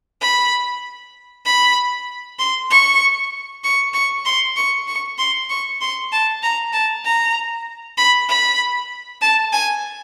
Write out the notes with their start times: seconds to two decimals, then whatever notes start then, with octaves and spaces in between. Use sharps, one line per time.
0.21 B5
1.46 B5
2.39 C6
2.71 C#6
3.64 C#6
3.94 C#6
4.25 C6
4.56 C#6
4.88 C#6
5.18 C6
5.50 C#6
5.81 C6
6.12 A5
6.43 A#5
6.73 A5
7.05 A#5
7.97 B5
8.29 B5
9.21 A5
9.53 G#5